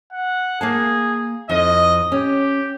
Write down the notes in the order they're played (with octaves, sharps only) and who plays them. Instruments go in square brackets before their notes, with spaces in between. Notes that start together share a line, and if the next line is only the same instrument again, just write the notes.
[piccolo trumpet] F#5
[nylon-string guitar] A#3 F5 A5 [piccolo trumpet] G#4
[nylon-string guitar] F2 E4 [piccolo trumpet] D#5
[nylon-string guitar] C#4 [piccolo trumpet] G4